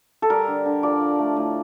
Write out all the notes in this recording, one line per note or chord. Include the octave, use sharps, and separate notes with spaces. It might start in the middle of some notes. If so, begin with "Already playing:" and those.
A4
G3 A#4
D3
D3
F3 D5
F3
A3
A2